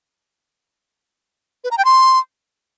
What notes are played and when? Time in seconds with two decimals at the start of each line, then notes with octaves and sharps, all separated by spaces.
1.64 B4
1.71 A#5
1.78 G5
1.85 C6